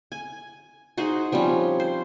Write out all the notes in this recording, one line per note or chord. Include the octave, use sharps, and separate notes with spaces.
G#5
D#4 F#4 G#4 C5
F3 G3 C4 C#4
C5